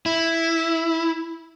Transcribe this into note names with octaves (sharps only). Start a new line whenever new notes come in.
E4